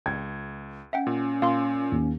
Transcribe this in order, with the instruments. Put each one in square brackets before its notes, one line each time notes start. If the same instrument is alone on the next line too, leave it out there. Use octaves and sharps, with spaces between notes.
[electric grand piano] C#2 [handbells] G5 [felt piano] G#6
[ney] C#4 [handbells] E5 F#5 G5
[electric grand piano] A#2
[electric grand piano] A#2 [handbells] F5 C6
[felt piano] D#2